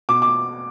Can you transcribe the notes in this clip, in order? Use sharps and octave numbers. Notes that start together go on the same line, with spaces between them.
B2 D6
D6